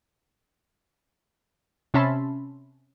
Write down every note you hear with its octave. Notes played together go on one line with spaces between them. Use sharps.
C3 C#4 E5 A5 B5 C6